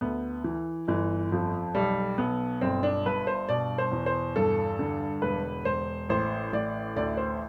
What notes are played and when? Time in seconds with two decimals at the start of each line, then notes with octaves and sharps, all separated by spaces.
0.01 D2 B3
0.44 E3
0.88 G1 E3
1.32 F2 F3
1.75 B1 G3
2.18 B1 B3
2.61 G1 C4
2.83 D4
3.05 G2 B4
3.27 C5
3.49 B2 D5
3.78 C5
3.92 E2
4.06 C5
4.36 G2 A4
4.79 D3
5.22 E1 B4
5.65 E1 C5
6.09 A1 C5
6.53 A1 D5
6.96 D2 D5
7.17 C5